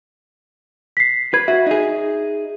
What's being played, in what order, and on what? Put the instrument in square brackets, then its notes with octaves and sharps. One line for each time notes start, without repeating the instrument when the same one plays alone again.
[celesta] B6 C7
[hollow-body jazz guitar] B4 [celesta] G#6
[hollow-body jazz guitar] F#4 [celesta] E5
[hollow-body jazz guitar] D#4 G#4